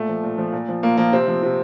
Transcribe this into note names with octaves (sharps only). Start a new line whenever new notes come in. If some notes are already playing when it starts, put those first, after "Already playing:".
Already playing: A#2 A3
F3
A#2
F3
A#2
F3
A#2 A#3
F3 A#3
C3 C4
F3
C3